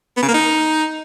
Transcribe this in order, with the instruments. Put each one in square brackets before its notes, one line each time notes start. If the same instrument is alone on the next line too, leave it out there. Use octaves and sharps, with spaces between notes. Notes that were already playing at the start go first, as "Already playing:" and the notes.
[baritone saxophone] B3
C#3
A#3
D#4